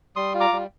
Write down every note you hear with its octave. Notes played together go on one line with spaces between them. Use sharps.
G3 C6 D#6
F4
A#5 D6
G3